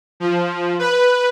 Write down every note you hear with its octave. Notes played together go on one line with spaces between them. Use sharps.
F3
B4